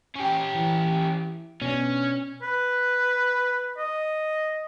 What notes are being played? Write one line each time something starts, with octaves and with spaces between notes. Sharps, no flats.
C#4 G4
E3
B2 C#4 D4
B4
D#5